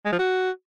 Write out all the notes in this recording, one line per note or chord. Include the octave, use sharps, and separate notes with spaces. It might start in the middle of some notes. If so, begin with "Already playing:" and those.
G#3
F3
F#4